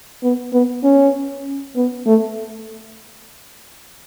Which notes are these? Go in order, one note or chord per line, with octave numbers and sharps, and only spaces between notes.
B3
B3
C#4
B3
A3